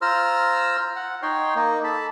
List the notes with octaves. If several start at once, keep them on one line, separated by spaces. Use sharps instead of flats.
F4 C5 A#5 E6 F6
F#5
D#4 C#5 G5 C6
A#3 D#4
A4 A5 B5